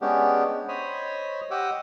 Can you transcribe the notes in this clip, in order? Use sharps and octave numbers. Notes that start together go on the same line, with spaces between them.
G#3 B3 C#4 D4 G4
C5 C#5 D#5 B5 D#6
G4 D#5 F#5 D6 E6